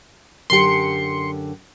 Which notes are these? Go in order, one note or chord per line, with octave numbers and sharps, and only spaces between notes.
F#2 D3 G4 C6 C#7